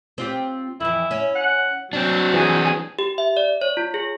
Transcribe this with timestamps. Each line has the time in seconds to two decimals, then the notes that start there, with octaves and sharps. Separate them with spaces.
0.18 C4 F4 G4
0.80 F2 E3 E4
1.11 C#4
1.36 F#5
1.93 F#3 C4 D4
2.34 E3 G#4
2.99 G4
3.18 E5
3.37 D5
3.61 C#5
3.77 F4
3.94 G#4